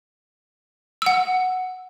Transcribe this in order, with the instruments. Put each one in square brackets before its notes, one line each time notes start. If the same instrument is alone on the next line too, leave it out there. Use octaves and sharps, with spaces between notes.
[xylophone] F#5 E6